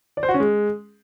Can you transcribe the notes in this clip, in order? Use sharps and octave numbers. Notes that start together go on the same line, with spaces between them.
D5
C5
F#4
C#4
G#3